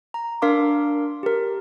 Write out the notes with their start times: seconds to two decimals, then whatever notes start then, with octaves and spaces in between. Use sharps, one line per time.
0.14 A#5
0.42 D4 A#4 F5 C6 D6
1.23 G4 A#4